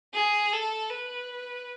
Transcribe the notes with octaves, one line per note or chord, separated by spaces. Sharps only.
G#4
A4
B4